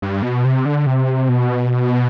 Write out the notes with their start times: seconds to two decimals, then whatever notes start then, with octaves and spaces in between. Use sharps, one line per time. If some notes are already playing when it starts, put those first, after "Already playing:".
0.02 G2
0.22 B2
0.45 C3
0.65 D3
0.86 C3
1.29 B2